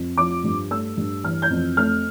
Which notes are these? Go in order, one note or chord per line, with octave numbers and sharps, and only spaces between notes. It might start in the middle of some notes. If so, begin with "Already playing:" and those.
Already playing: F2
F3 D6
G2
A3 E6
G2
E3 F6
G6
F2
A3 F6